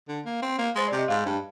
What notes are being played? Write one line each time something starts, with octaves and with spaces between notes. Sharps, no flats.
D3
A#3
C4
A#3
G#3 C5
C3 D5
D#5
G#2 F5
G2